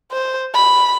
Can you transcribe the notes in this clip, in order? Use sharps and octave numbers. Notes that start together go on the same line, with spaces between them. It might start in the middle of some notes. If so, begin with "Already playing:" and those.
C5
B5